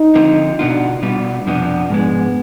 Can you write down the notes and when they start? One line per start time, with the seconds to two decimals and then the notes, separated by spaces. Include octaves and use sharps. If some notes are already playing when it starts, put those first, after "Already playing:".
Already playing: D#4
0.15 D3 F3 C4 F4
0.58 B2 B3 D4 F4
1.03 B2 G3 B3 F4
1.46 F2 C3 F3 B3 D4
1.90 G#2 F3 G#3 B3